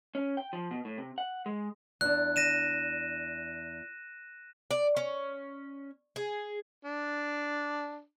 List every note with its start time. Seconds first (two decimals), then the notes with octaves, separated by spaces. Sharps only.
0.15 C#4
0.37 G5
0.53 F3
0.71 B2
0.85 A2
0.98 C3
1.18 F#5
1.46 G#3
2.01 E2 D4 F#6
2.36 A#6 D#7 E7
4.71 D5
4.97 C#4
6.16 G#4
6.85 D4